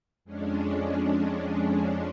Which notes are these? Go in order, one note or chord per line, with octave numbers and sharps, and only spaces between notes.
F2 G#3 C#4 D4